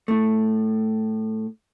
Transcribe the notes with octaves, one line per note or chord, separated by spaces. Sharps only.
A2 A3